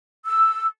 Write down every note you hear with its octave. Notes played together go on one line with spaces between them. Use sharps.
E6